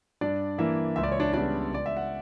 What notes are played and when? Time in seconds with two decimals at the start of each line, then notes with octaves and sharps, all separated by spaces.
0.21 G2 D4 D5
0.58 E3 A#3 E4 E5
0.96 C#2 E5
1.03 D5
1.12 C#5
1.20 D4 D5
1.33 C#3 G3 B3 D4 D5
1.71 C#2 D5
1.86 E5
1.97 F#5